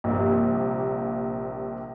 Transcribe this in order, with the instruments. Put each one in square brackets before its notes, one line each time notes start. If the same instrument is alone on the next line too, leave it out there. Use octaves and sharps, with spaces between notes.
[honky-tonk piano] A#1 C3 G3 A#3